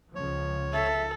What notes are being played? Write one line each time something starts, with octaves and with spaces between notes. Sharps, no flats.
C#2 C#3 F3 C#5
A4 E5